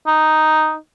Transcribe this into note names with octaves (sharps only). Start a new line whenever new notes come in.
D#4